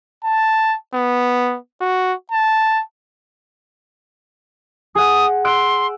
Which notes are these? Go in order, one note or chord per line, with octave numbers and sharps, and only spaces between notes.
A5
B3
F#4
A5
G#4 F#5 D#6
C6 E6 F#6 D7